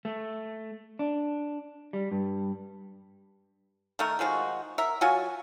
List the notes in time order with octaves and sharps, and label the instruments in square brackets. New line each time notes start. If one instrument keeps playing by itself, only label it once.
[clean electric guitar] A3
D4
G3
G2
[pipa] D#3 A3 A#4
D#3 F3 G#3 F#4
A#4 E5
F#3 F4 F#4 G#5